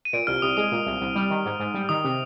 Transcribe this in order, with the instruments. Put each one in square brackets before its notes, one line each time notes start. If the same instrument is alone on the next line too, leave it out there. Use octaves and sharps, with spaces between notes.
[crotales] D#7
[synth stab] A#2 [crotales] D7
[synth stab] C2 [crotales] F6
[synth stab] C2 [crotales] D#6
[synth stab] G#3 [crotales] D#6
[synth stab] A#2
C2
C2
G3
D#3
G#2
G#2
G3
[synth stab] D#3 [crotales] D#6
[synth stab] C3